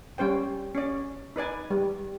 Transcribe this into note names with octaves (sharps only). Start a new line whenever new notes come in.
G3 C#4 C5 G5
C#4 D5
D#4 B4 D5 G#5
G3